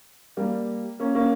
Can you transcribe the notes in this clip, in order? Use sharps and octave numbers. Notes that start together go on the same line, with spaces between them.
G3 A#3
A#3 C#4
A#3 C#4